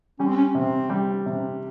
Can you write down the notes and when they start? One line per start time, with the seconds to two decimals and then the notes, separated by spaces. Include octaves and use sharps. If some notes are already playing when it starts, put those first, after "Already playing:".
0.19 G3 C#4
0.27 C4
0.37 C#4
0.55 C3 C4
0.90 G3
1.26 C3